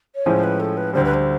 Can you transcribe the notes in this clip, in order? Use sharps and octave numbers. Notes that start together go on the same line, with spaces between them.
C#5
A2 F3 G#3 C#4 C5
B4
A4
B4
D2 D3 G3 C5
B4
C5